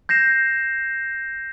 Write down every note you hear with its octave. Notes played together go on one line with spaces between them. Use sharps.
G6 A#6 C7 E7